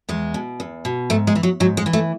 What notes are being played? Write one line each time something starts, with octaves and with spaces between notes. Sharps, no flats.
E2 G#3
B2
E2
B2
G#2 A3
G#3
E3
F#3
G#2 F#3
G#3
E3
A3